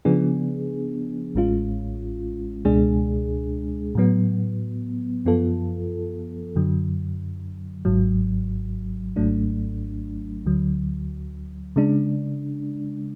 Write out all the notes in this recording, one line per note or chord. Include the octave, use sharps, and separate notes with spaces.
C#3 F3 B3 D4 G#4
A1 A2 G#3 C#4 F4
C#2 B2 G#3 D4 G#4
A2 F#3 B3
F#2 F3 B3 F4 A4
F#2 D3 F#3
G#1 G#2 F#3
G#1 G#2 F#3 A3 D4
D2 D3 F#3
C#3 G#3 D4